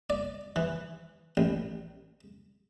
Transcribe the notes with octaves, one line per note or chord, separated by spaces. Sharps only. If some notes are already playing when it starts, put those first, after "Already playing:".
D5
E3
A1